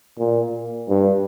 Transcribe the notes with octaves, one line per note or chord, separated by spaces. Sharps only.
A#2
G2